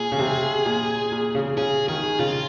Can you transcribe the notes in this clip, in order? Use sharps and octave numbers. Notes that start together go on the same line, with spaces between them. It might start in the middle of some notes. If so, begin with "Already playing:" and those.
Already playing: A#2 G#4
C#3
C3
A#2
A#2
C#3
C#3 G#4
D#3 G#4
C#3 F4